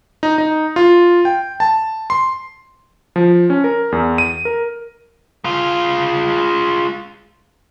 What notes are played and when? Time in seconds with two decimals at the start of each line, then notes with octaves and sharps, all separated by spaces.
0.23 D#4
0.38 D#4
0.76 F4
1.25 G5
1.60 A5
2.10 C6
3.16 F3
3.50 C#4
3.64 A#4
3.92 E2
4.18 D#7
4.45 A#4
5.44 G#3 F4